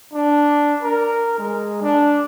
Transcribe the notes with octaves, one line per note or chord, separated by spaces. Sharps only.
D4
A#4
G#3
D4